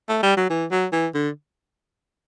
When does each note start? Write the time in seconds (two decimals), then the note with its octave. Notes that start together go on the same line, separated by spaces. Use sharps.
0.09 A3
0.23 G3
0.37 F#3
0.50 E3
0.71 F#3
0.93 E3
1.14 D3